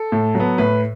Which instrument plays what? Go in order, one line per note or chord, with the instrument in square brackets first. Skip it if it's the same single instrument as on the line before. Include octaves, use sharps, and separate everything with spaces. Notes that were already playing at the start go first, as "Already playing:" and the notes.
Already playing: [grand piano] A4
A2
F#3
B3
A2 B4